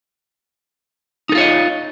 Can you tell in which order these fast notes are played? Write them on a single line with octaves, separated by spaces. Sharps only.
D#4 A4 F4 C#5 D#5